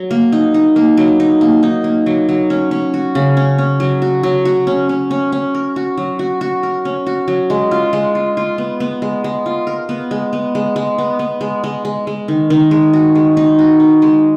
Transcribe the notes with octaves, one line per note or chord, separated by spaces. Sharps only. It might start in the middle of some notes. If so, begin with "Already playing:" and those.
Already playing: F#3
A#3
D#4
D#4
A#3
F#3
D#4
A#3
D#4
A#3
F#3
F#3
C#4
C#4
F#4
C#3
C#4
C#4
F#3
F#4
F#3
F#4
C#4
C#4
C#4
C#4
A#4
F#4
F#3
F#4
F#4
A#4
C#4
F#4
F#3
G#3
F4
G#3
F4
F4
B3
B3
G#3
G#3
F4
A#4
B3
G#3
B3
G#3
G#3
B3
B3
G#3
G#3
G#3
G#3
D#3
D#3
G#3
F#4
G#3
D#4
F#4
D#4
G#3